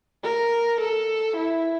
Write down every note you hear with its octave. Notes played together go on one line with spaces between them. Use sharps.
A#4
A4
E4